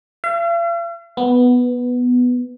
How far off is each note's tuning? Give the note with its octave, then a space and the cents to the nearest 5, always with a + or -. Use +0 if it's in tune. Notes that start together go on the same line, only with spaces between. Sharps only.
F5 -45
B3 +0